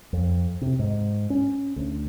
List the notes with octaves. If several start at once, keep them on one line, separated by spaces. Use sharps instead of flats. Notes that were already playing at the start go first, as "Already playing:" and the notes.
F2
C3
G#2
C#4
D2